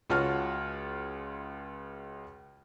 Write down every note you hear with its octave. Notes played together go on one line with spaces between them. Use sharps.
C#2 F4 F#4 C#5 A5 F6